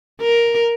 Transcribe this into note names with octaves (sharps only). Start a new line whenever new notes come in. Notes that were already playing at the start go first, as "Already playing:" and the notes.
A#4